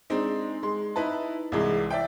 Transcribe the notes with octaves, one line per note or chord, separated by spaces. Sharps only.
G#3 C4 D4 D#4
G#3 C6
D#4 E4 B4 A5
C2 C3 E3 G#3
D5 E5 G5